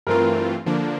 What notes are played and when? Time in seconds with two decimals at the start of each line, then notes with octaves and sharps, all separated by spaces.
0.07 G2 E3 A3 C4 F4 A#4
0.66 D3 F3 A#3 D4